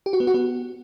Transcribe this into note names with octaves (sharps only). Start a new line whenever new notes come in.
G4
F#4
B3
F#4
B3